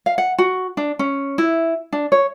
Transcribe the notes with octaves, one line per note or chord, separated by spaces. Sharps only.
F5
F#5
F#4
D4
C#4
E4
D4
C#5